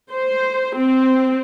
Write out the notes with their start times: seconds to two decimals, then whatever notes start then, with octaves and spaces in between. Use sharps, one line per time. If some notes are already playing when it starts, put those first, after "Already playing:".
0.11 C5
0.76 C4